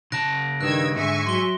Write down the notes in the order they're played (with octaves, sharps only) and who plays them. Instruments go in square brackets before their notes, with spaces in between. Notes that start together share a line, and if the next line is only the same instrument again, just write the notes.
[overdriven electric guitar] C#3 A5 [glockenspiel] F#6 A#6 D7
[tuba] G2 [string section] D#3 E6 G#6 [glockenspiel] F#6
[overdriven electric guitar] G#2 [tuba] D3 [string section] E5 G#5 C#6
[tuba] F#3 [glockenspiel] C6 G7